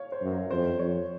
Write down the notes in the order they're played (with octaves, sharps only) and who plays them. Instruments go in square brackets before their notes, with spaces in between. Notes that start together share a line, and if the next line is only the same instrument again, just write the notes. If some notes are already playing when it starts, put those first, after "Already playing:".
Already playing: [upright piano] C#5 F5
C5
[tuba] F#2
[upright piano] A#4
[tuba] F2 [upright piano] C5
[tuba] F2 [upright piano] C#5